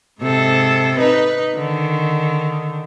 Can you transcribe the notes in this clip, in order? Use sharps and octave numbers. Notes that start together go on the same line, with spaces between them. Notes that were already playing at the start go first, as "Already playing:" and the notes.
G#2 C3 A4
D#4 B4
D3 D#3